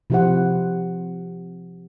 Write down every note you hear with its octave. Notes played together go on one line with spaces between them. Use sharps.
C3 F3 E4 G4 C5 F#5